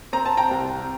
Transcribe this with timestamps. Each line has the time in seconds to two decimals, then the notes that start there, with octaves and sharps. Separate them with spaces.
0.13 C4 A#5
0.25 A5
0.37 G5 A#5
0.51 C2